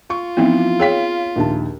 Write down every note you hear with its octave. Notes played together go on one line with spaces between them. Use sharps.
F4 C#6
E3 F3 B3 C4 D#4 E4
G#4 C#5 F5 G5 B6
A#1 D#2 A5